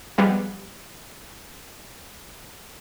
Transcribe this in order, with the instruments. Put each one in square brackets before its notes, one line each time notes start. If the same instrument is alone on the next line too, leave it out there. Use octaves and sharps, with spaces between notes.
[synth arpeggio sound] F3 G3 G#3 B3